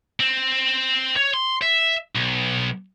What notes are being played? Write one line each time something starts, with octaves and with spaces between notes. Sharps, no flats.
C4
C#5
C6
E5
B1